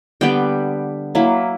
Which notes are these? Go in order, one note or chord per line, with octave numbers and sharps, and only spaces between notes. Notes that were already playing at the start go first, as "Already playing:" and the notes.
D3 G3 B3 G5
F#3 A#3 E4